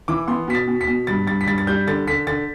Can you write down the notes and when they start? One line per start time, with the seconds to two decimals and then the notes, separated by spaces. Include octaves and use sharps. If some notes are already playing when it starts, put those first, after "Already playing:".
0.08 E3 D6
0.27 B3 C6
0.48 B2 B6
0.55 A6
0.68 B2
0.81 B6
0.87 B2
1.07 G2 A6
1.27 G2 A6
1.41 B6
1.47 G2 A6
1.58 A6
1.67 G3 G6
1.87 D3 A6
2.07 D3 B6
2.27 D3 A6